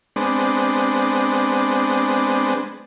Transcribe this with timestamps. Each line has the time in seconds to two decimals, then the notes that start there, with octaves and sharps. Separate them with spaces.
0.16 G#3 B3 C4 D4